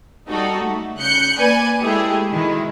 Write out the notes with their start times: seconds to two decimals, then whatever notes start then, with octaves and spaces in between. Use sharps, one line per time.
0.29 G3 D#4 F#4 A4
0.63 A3
0.99 C#3 F#6 G6 C#7
1.38 A#3 B4 D5 G#5
1.81 G#3 A3 E4 G4 G#4
2.32 B2 D#3 G#3 E4